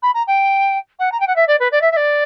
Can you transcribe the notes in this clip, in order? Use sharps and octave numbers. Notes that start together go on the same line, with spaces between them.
B5
A#5
G5
F#5
A#5
G5
F#5
E5
D5
B4
D5
E5
E5
D5